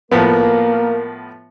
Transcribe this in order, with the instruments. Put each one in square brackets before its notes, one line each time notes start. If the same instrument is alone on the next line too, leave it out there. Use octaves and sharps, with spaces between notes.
[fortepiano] A2 F3 B3 [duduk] A#3 [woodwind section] A#4